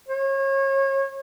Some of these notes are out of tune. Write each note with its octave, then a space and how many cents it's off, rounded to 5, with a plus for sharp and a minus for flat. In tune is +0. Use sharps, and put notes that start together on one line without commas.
C#5 -30